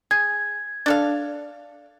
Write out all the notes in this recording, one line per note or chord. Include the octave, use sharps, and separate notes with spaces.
G#4 G#6
D4 A4 F5